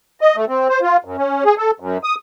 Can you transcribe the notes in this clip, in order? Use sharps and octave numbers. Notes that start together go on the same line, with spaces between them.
D#5
A3
C4
C5
F4
F#2
C#4
G#4
A4
F#2
D#6